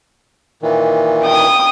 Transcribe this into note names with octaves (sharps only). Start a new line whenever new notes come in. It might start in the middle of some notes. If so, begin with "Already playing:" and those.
A#2 D#3 E3
G5 D#6